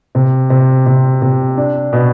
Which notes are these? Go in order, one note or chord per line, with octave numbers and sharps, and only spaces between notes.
C3
C3
C3
C3
D4
B2